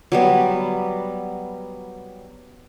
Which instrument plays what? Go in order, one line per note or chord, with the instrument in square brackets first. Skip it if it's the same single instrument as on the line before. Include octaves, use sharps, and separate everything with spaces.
[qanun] F#3 G3 B3